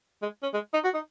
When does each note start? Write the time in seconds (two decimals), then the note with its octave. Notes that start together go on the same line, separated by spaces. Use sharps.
0.22 G#3
0.43 C#4
0.53 G#3
0.74 D#4
0.84 F#4
0.94 D#4